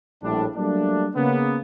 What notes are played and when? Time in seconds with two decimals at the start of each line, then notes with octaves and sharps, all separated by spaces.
0.23 A#1 A2 G3 D4
0.56 F#3 G3 A3 A#3 D4
1.15 C#3 A#3 B3